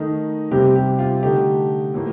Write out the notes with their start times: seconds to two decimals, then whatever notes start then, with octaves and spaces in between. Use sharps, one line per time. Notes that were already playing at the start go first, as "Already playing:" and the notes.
Already playing: D#3 A3 D#4
0.51 C3 G3 C4 G4
0.76 G4
0.99 F4
1.23 D3 A3 D#4 G4
1.94 A2 F3 A#3